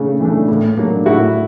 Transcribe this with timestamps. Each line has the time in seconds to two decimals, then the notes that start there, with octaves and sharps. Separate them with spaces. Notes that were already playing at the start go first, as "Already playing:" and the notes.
Already playing: C#3 A3 D4
0.20 E3 A3 D4
0.48 A2
0.77 F#3 A#3 D4
1.06 A2 E4 F#4